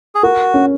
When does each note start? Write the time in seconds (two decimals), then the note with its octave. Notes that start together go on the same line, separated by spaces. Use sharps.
0.15 G#4
0.23 F#4 A#4
0.54 C#4